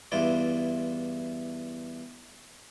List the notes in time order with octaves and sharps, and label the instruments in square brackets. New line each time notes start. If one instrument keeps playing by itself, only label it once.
[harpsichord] E2 G2 E4 F4 D6